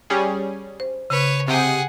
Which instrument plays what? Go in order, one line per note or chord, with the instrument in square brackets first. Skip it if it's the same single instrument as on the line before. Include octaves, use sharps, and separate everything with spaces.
[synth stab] G3 C#4 G#4
[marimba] C5
[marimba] C#3 [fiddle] B4 C#5
[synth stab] C3 G5 D#6 [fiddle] G#4 F#5